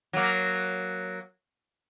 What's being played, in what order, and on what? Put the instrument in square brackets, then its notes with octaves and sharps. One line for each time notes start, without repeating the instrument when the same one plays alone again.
[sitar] F#3 A#3